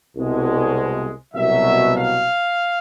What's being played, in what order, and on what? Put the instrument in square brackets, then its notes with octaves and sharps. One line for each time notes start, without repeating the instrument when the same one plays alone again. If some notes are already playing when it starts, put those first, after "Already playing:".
[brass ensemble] C2 B2 G#3
C2 B2 F#3 E5
F5